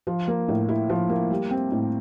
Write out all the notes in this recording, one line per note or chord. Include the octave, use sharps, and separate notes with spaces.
F3
A#3
A2
E4
F3
A#3
G3
C4
A2